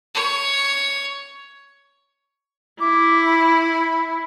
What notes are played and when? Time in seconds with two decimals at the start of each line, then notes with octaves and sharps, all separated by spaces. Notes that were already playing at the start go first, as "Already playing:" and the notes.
0.14 C#5
2.80 E4 D6
3.24 B5